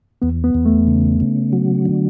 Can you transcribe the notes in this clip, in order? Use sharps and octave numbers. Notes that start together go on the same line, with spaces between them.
E2 B3
B3
E2
A3
C#3
C#3
F#3
D3